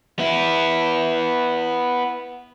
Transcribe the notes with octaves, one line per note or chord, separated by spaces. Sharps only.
B3 E4